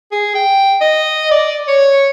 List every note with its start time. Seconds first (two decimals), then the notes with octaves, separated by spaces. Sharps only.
0.12 G#4
0.35 G5
0.81 D#5
1.31 D5
1.68 C#5